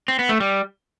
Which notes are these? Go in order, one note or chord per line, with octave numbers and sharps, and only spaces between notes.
C4
B3
A3
G3